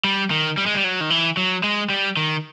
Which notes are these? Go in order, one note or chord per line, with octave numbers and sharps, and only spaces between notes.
G3
D#3
G3
G#3
G3
F#3
D#3
E3
F#3
G#3
G3
D#3